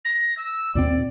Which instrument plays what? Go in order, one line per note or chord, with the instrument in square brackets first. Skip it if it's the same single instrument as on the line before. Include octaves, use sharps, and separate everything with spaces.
[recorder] A#6
E6
[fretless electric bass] D#2 A#2 C4 [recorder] D5